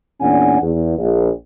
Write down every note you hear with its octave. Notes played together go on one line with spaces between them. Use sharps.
E2 A#2 C#4 D4 F#5 G#5
E2
A#1